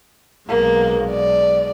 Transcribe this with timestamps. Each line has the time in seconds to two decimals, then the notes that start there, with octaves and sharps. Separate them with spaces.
0.49 B1 G#3 A#3
1.11 D5